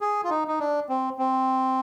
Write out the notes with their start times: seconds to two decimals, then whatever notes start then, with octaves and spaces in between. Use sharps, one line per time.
0.01 G#4
0.24 F4
0.30 D#4
0.48 D#4
0.59 D4
0.89 C4
1.18 C4